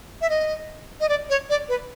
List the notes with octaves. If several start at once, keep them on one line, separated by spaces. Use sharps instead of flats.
E5
D#5
D#5
D5
C#5
D5
B4